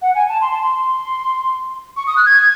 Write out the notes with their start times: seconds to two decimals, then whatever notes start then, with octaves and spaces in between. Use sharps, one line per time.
0.02 F#5
0.15 G#5
0.29 A5
0.41 C6
0.52 A5
0.61 C6
1.97 C#6
2.07 D#6
2.17 F#6
2.26 G#6